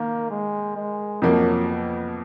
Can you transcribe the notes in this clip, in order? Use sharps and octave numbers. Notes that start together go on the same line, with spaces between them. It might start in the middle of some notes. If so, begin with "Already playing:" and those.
Already playing: D#3 A#3
G#3
G#3
F2 F3 F#3 A#3
B3